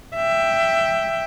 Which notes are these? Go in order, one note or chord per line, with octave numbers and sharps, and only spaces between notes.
E5 G5